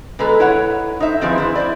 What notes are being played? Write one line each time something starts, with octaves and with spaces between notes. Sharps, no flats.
B2 G#3 A4 B4 A#5
E4 B4 C#5 F#5
D#4 C5 E5
D#3 F3 C4 E4 G#4 B4
E4 B4 C5
E4 C5 D5